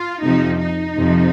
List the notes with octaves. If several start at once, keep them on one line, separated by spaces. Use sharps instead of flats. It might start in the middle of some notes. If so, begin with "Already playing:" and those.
Already playing: F4
F2 C3 F3 D#4
D#4
F2 C3 F3